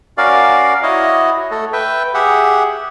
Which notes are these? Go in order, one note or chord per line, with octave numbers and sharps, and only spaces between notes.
C#4 F#4 A#4 D5 F5
E4 F#4 C#5 D#5
A3 A4
B4 E5 G5
G4 G#4 E5 F#5